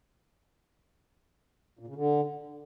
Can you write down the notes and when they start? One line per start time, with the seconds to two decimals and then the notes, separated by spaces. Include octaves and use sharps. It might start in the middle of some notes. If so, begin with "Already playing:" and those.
1.79 A#2
1.87 C#3
1.96 D3